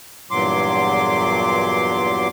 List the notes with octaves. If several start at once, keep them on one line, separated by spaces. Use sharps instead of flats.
E2 G2 A#2 F#3 C6 D6